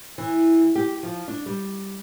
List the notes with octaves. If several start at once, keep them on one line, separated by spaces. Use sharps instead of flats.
E3
G4
F3
D4
G3